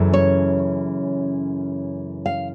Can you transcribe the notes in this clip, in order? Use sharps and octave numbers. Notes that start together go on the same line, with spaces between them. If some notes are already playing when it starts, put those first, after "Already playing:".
Already playing: F#2 C#3 E3 A3
C#5
F5